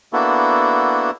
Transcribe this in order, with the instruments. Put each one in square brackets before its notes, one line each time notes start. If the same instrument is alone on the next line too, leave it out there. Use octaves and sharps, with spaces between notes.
[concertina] A#3 B3 D4 E4 F#4 A4